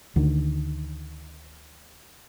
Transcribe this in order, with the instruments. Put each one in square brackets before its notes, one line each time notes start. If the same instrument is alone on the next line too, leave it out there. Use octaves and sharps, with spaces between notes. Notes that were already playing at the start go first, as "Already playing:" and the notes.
[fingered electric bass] D2 D3 D#3